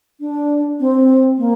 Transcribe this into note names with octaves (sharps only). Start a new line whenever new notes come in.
D4
C4
A#3